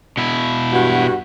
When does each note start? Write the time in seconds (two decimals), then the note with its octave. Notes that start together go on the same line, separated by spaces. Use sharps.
0.17 B2 E4
0.73 G2 F#4